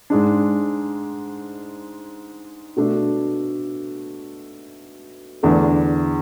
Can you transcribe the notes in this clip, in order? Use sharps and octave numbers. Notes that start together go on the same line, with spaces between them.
G#2 G#3 D4
B2 A3 D4
E2 D3 A3 D4